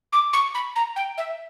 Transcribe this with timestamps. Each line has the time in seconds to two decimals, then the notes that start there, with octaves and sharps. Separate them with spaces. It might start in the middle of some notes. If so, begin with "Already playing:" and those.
0.13 D6
0.33 C#6
0.54 B5
0.76 A#5
0.96 G5
1.18 E5